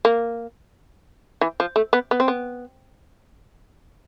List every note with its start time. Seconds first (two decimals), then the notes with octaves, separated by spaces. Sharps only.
0.05 A#3
1.41 E3
1.60 F3
1.76 A3
1.93 B3
2.11 B3
2.20 C4
2.28 B3